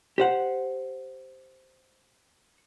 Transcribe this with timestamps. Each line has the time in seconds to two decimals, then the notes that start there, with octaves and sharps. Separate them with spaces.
0.18 G4 C5 F#5